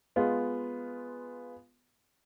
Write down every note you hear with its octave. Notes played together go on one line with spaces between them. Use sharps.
G#3 B3 F4